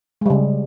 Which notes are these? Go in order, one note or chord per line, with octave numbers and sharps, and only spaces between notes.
C#3 G3 G#3